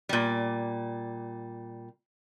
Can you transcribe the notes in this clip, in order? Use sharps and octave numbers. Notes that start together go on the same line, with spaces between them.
A#2 G3